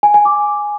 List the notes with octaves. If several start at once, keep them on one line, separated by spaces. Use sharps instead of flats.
G#5
G#5
D6